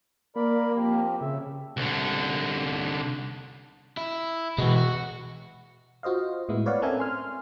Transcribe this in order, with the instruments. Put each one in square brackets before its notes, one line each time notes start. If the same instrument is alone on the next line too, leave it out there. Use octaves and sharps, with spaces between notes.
[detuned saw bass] A#3 [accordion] A#4 D5 B5
[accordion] F3 C4 G4
[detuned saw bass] C#3 [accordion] E5
[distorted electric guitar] C2 D3
[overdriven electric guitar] E4
[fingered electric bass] B2 E3 [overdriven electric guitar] G#3 F#4
[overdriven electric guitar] F#4
[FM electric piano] F4 F#4 C5 D#5 F5
A2 G#3 B3 E4
B4 C#5 D5 F5 F#5
C4 C#4 A4 A#4 E5 G#5
G#5 C6 F6